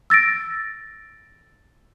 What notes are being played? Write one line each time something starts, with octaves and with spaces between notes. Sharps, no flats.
E6 A6 A#6 D7